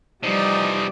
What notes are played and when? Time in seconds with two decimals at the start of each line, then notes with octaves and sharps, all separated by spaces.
0.24 C3 E3 F3 G3 D#4 D5